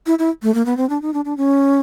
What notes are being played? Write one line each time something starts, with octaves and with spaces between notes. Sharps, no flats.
E4
E4
A3
A#3
B3
C4
D4
D#4
D4
D4
C#4